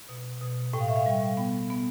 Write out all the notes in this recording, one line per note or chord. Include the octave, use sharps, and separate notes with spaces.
B2
B2
A2 G5
F5
E5
F5
G3
B3
B3